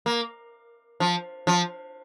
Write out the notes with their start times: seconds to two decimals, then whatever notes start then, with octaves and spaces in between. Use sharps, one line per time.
0.06 A#3
1.00 F3
1.47 F3